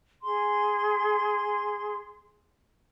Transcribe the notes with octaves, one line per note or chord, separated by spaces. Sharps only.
G#4 C6